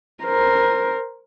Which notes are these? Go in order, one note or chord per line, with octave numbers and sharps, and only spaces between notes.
A#4 C5